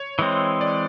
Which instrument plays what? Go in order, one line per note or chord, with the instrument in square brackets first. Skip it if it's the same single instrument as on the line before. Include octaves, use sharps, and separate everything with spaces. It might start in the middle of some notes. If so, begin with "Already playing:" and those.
Already playing: [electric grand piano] C#5
[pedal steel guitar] E3 G#3 C4
[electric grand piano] D5